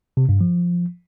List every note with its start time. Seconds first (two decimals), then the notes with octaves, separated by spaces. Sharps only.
0.17 C3
0.29 G2
0.41 F3